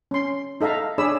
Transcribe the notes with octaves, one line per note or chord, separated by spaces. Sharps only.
C#4 C6
D#4 A4 E5 F5 A#5
D4 G#4 C#5 D5 B5 E6